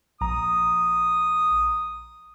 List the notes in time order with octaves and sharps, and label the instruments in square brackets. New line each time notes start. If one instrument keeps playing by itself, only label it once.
[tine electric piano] A#1 A#5 [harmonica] D#6